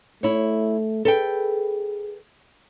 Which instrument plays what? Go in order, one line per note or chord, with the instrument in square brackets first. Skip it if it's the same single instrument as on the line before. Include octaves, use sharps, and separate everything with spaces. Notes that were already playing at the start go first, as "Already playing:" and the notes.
[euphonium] A3 [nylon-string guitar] E4 C#5
[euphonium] G#4 [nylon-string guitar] A4 B4 G5